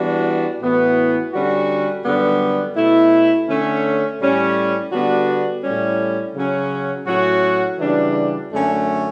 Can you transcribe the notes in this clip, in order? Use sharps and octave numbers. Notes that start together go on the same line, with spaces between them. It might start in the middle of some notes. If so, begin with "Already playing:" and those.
Already playing: E3 G3 B3 D4 F#4
A2 E3 B3 F#4
D3 G3 C#4 F#4
F#2 D3 G3 B3
B2 A3 E4
D3 A3 C#4
A2 G3 C#4
D3 G3 B3 D4 F#4
A2 G3 C#4
C#3 F#3 C#4
A2 F#3 C#4 F#4
C#3 E3 G3 D4 F#4
F#2 D3 A3 C#4